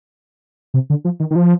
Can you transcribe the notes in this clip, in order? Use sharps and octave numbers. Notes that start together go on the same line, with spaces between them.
C3
D3
F3
D#3
D#3
F3